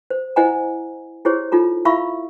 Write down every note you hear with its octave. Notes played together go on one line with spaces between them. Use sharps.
C5
E4 C5 D#5 F#5 G#5 A#5
E4 G4 G#4 C5 C#5
D#4 F4 A4 A#5
E4 E5 F5 B5 C#6 E6